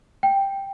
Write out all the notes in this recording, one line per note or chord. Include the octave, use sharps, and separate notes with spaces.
G5